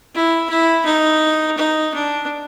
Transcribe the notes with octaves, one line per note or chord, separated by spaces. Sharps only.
E4
E4
D#4
D#4
D4